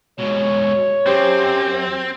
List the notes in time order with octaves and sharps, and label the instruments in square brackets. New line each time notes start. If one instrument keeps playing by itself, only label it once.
[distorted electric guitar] G#2 B2 [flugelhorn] C#5
[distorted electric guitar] F#2 [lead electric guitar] C4 [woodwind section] G4 C5